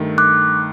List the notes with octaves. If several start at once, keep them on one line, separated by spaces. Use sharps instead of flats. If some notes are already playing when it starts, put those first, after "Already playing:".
Already playing: G2 D#3 A3
D6 F#6